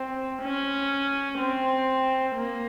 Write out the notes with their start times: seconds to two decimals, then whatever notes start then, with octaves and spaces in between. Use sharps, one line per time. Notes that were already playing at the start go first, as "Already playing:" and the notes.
Already playing: C4
0.42 C#4
1.38 C4
2.35 A#3